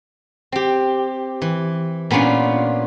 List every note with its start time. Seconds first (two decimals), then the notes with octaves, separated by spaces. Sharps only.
0.52 C4 G4
1.42 E3
2.11 A#2 B3 C#4 D4 F4